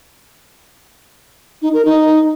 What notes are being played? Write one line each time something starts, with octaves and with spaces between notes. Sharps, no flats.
D#4
A#4
D#4